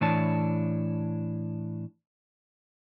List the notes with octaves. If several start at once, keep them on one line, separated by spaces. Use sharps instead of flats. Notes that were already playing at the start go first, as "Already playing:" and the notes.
A2 E3 D4 C#5 A5